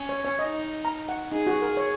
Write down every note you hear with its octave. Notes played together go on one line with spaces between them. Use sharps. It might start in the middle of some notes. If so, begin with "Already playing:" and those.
Already playing: C#4
C#5
C#5
D#4 D#5
A#5
F#5
D#4 G#4
F#4
A#4
C#5